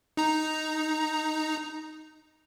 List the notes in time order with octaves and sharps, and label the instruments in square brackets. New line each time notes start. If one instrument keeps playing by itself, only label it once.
[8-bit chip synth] D#4 A#5